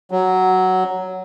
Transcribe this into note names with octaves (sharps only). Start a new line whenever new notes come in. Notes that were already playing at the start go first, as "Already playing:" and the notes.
F#3